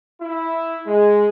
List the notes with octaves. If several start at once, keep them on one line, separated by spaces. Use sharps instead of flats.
E4
G#3